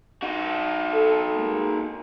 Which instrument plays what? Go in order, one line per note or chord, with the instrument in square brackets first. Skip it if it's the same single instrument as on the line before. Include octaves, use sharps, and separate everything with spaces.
[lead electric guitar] D#4 F#4
[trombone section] A4
G#3 A#3